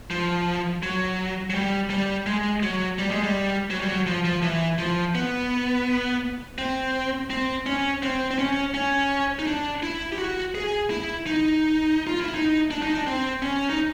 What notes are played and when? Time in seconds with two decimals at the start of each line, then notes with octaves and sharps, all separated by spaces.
0.11 F3
0.83 F#3
1.50 F#3
1.55 G3
1.90 G3
2.26 G#3
2.63 F#3
2.99 G3
3.11 G#3
3.23 G3
3.70 F#3
3.81 G3
3.88 F#3
4.06 F3
4.24 F3
4.42 E3
4.78 F3
5.15 B3
6.58 C4
7.30 C4
7.66 C#4
8.03 C4
8.31 C4
8.39 C#4
8.74 C#4
9.39 D#4
9.47 D4
9.83 E4
10.12 G4
10.18 F#4
10.55 G#4
10.90 E4
11.27 D#4
12.07 F4
12.21 E4
12.35 D#4
12.71 D4
12.83 D#4
12.94 D4
13.07 C4
13.42 C#4
13.70 D#4